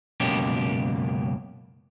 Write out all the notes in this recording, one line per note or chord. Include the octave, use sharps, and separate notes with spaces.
C#2 F#2 B2 A#3 G4